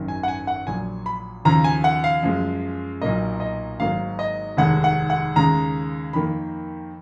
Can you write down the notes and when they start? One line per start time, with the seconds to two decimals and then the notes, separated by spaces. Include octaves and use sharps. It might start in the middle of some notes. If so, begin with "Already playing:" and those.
Already playing: G#1 F#2 D#3
0.08 G#5
0.23 F#5
0.28 G#5
0.47 F#5
0.67 A#1 A#2 F#3 G#5
1.06 B5
1.45 D#2 C#3 F3 A#5
1.64 G#5
1.84 F#5
2.04 F5
2.23 F#2 F3 G#3
3.02 B1 A#2 F#3 A#3 D#5
3.40 D#5
3.79 G#1 G#2 F#3 A#3 F5
4.19 D#5
4.57 F1 D#2 D#3 G#3 F#5
4.84 F#5
5.10 F#5
5.36 D#2 C#3 G#3 A#5
6.13 F2 D#3 A#3 B5